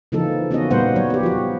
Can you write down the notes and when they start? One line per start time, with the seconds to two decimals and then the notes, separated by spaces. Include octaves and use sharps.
0.12 C#3 E3 F3 A#3 D#4 A4
0.51 A#3 B3 C#4 D#4 F#4 D#5
0.71 A#2 G3 A#3 B3 C5 F#5
0.96 F#3 C#5
1.10 B3 G4
1.23 F3 F#4